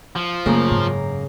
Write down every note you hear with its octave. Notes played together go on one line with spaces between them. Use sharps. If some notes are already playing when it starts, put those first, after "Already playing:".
F3
F#2 C#3 A3 A#3
G#2